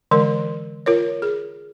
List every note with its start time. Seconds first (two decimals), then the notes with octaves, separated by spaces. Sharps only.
0.11 D3 E3 G#3 A#4
0.86 F4 A#4 C#5
1.22 G#4